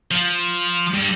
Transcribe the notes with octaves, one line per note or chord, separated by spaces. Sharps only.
F3
G2